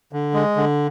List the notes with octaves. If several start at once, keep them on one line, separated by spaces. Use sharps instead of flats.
D3
G#3
D3